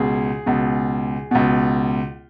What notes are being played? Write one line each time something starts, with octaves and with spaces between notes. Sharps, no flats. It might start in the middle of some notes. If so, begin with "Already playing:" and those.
Already playing: C#2 B2 G#4
C#2 B2
C#2 B2